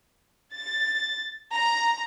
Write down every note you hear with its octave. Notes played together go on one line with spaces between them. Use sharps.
A6
A#5